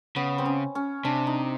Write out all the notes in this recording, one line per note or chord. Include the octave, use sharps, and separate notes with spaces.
C#3 B3
C4
C#4
C#4
C3 D4
D#4